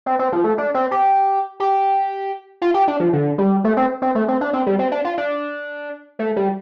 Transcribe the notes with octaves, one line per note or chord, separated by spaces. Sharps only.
C4
C4
F3
A3
D4
C4
G4
G4
F4
G4
D4
F3
D3
G3
A3
C4
C4
A3
C4
D4
C4
G3
C4
D4
F4
D4
A3
G3